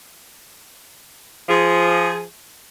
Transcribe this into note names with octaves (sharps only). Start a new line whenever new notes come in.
F3 G#4